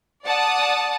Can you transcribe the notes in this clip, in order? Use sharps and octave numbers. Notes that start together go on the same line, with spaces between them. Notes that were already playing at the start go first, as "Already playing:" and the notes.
D5 F#5 A5 D#6